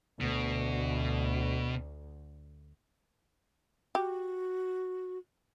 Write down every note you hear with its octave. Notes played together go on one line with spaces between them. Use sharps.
D2 B2
F#4 G4